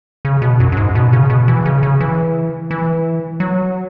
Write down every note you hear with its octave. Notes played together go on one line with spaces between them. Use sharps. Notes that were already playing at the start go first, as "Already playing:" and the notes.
C#3
B2
F#2
F#2
G#2
B2
C#3
B2
E3
C#3
C#3
E3
E3
F#3